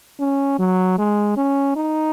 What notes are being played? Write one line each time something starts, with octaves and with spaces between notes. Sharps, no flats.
C#4
F#3
G#3
C#4
D#4